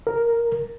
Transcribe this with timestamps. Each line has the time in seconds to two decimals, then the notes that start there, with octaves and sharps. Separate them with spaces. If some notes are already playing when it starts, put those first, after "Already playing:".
0.07 A#4